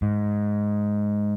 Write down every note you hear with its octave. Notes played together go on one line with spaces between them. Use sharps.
G#2